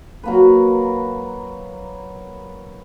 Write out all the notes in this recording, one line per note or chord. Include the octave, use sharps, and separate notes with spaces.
F#3 A#3 B4